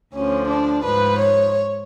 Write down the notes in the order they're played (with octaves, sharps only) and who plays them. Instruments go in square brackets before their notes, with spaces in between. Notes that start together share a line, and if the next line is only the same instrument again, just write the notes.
[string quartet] D2 D3 F3 C#4
D4
G#2 F3 B4
C#5